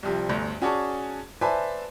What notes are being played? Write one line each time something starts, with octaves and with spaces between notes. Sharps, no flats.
C2 C3 F3 G3
G1 D2
C#4 F#4 G#4 D5 A5 C#6
B4 C5 D5 E5 G#5 A5